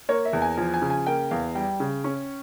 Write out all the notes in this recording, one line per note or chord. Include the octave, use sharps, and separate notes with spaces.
A#3 C#5
E5
E2
G#5
F3 G#5
G#5
C#3
G#5
A#3 G5
E2 F5
G3 G5
C#3
C#4